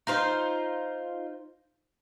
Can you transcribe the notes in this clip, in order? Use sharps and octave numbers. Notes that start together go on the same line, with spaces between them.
D#4 F4 C5